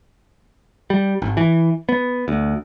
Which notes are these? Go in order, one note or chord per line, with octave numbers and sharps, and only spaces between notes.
G3
G#1
E3
B3
D2